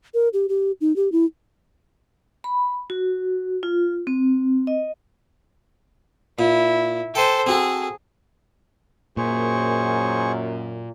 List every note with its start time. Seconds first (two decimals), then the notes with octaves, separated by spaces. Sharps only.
0.14 A#4
0.33 G4
0.49 G4
0.81 D#4
0.96 G4
1.12 E4
2.44 B5
2.90 F#4
3.63 F4
4.07 C4
4.67 D#5
6.39 A#2 E4
7.15 A4 C5 G5 G#5
7.46 C4 F#4 G#4 A4
9.17 F#2 A#2 G#4 C5 C#6